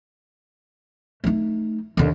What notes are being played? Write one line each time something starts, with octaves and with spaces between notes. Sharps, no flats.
A3 D#4
D#2 D3